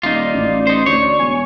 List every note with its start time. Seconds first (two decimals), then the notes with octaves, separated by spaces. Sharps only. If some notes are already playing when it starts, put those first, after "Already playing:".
0.03 D#1 D#4 F4 D5
0.33 A1
0.67 D#4 C5
0.86 D2 C#5
1.19 E1 G#5